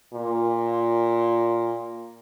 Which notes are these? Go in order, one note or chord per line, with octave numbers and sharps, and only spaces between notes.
A#2